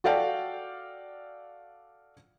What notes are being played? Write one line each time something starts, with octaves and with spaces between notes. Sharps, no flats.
F#4 A4 D5 F5 G5